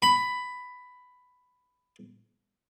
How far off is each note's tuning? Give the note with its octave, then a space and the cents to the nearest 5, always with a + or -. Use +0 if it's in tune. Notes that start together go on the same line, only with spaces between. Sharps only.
B5 +10